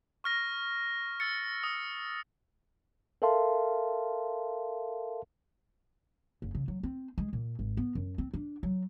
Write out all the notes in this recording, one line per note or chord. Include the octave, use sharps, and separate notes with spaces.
C#6 F6 A#6
E6 A6 C#7
D#6
A4 A#4 E5 F5 A5 C6
F#1
C#3
F#3
C4
G#3
A#2
G#1
B3
F#2
C4
D4
F#3